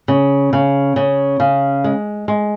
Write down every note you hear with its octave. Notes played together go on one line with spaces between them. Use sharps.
C#3
C#3
C#3
C#3
G#3
G#3